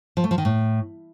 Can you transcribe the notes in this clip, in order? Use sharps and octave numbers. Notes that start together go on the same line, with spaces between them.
F3
A3
F3
D#3
A2